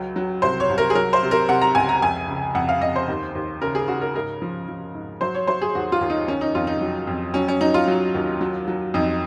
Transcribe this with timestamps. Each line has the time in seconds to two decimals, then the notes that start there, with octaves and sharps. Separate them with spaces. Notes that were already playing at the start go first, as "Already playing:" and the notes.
Already playing: C#2 F#3
0.16 F#3
0.42 C2 C5
0.60 C#5
0.69 C2
0.78 A#4
0.90 G#4
0.95 F#3 A#4
1.13 C5
1.23 C3
1.31 A#4
1.49 C3 F#5
1.61 A#5
1.75 C#2 G#5
1.89 A#5
2.02 F2 G#5
2.28 C#3
2.55 F2 F#5
2.69 F5
2.81 F2 D#5
2.96 C5
3.08 D#2
3.35 D#2
3.62 C#3 A#4
3.75 G#4
3.88 C#3 F#4
4.01 A#4
4.15 G#2 A#4
4.42 F3
4.68 F3
4.94 G#2
5.21 F#3 C5
5.35 C#5
5.47 F#3 C5
5.62 G#4
5.75 D#2 F#4
5.92 F4
6.01 D#2
6.10 D#4
6.28 D#3 C#4
6.41 D#4
6.55 F2 F4
6.67 D#4
6.81 F#3
7.07 F2
7.34 F#3 C#4
7.48 C#4
7.61 F#3 D#4
7.74 F4
7.87 F#3
8.14 D#2
8.41 F#3
8.68 F#3
8.94 F2 D#4